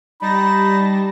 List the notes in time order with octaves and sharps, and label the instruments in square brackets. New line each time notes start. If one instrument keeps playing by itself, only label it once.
[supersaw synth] G3 A5 A#6 [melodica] D#4 [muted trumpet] B5